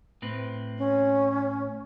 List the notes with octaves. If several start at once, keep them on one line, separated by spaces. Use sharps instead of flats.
A2 C4 B4
C#4